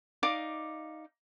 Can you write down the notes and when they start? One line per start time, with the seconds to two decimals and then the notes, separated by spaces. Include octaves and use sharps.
0.23 D#4 D5 F5 D6